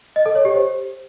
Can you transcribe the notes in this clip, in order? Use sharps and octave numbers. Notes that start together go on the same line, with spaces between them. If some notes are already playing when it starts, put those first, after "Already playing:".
D#5
A4
C#5
G4
C5